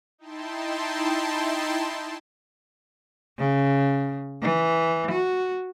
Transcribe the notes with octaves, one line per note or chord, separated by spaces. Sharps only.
D#4 E4 G5 A5 C6
C#3
E3
F#4